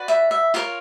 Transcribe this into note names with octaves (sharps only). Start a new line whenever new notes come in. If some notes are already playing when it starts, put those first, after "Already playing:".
Already playing: F#4 B4 D5
E5
E5
F4 A#4 C#5 F5